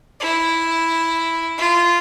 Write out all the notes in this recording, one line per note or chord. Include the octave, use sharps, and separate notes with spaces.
E4
F4